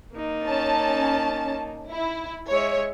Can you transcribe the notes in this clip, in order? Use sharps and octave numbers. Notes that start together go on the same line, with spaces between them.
A#3 D#4
C#4 A5
E4
G#3 C#5 E5